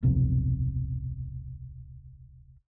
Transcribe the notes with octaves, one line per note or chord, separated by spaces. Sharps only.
D1 B1 F2 C3